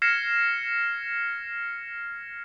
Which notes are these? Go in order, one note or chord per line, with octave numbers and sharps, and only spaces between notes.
F6 G#6 A#6 C7 C#7 E7